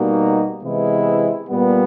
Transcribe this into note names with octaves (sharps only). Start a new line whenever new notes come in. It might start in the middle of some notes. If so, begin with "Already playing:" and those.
Already playing: B2 G3 A#3 D#4 F#4
C3 E3 G#3 B3 E4
A#2 G3 B3